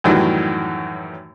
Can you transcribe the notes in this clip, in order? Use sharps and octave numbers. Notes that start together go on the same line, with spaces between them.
F#2 A2 D#3 E3 F#3 G3